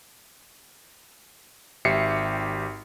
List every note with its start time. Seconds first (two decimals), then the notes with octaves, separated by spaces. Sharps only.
1.85 G#1 G4 E5 C7 C#7